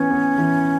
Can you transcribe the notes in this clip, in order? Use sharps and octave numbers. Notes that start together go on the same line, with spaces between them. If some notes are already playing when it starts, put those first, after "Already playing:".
Already playing: E3 B3 C#4
B3
E3